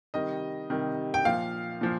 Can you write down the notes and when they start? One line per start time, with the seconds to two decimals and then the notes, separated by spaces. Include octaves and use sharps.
0.14 C3 D#3 G3 D#5
0.70 C3 D#3 G3
1.14 G5
1.25 A#2 F3 F5
1.81 A#2 F3